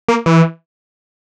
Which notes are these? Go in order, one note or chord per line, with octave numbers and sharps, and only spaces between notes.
A#3
E3